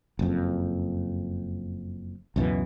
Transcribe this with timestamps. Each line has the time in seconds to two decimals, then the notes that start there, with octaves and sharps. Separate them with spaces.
0.19 F#1 F2
2.36 C#2 F#2 B2 E3